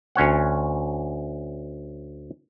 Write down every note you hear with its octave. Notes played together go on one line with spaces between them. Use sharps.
D2 C#4 C#5 F#5